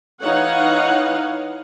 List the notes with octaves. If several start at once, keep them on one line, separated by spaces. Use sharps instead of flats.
E3 D#4 C#5 F5 F#5